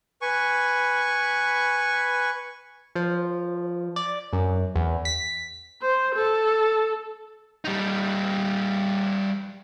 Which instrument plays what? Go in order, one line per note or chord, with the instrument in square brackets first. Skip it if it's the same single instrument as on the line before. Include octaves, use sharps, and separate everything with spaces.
[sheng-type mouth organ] B4 G#5 C#6
[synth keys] F3
D5
F#2
E2
B6
[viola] C5
A4
[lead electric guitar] G3 D#4